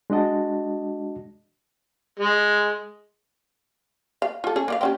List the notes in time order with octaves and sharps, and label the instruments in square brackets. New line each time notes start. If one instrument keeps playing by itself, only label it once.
[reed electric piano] G#3 D4 F#4 D#5 A5
[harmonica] G#3
[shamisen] F5
F4 A4
C#4 G#4 A4
A#3 D5 F5
C4 C#4 G4